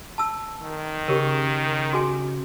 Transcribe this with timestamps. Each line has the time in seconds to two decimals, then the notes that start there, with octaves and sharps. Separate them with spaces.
0.18 A5 E6
0.62 D#3
1.08 C#3 G4 A#4
1.93 F#4 G#4 G#5